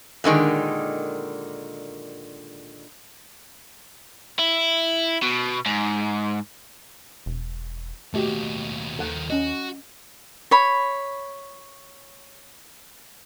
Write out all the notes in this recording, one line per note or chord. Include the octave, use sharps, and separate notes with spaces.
A#2 D3 D#3 G#3
E4
B2
G#2
E1
D#2 B2 A3 F#4 G4 D#5
D#2 D#3 F3 A4 F#5
C#4 F#4 D#5
C#5 B5